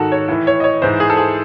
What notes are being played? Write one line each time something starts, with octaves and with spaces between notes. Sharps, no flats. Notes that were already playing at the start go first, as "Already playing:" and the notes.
Already playing: G#2 D#3 F#4 A4
C#5
A2 E3
C#5
D#5
C#5
G#2 E3 C5
G#4
A4
G#4